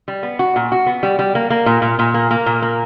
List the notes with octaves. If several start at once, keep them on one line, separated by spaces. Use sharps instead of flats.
G3
B3
F#4
A#2
F#4
B3
G3
G3
A#3
A#3
A#2
A#2
A#2
A#3
A#3
A#2
A#3